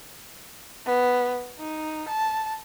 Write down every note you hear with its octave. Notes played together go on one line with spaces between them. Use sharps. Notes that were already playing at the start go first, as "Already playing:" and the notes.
B3
D#4
A5